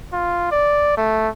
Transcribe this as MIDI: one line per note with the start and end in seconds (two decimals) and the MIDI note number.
0.13 0.50 65
0.52 0.93 74
0.97 1.29 57